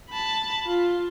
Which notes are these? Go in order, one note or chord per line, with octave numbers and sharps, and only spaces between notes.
A5 B5
F4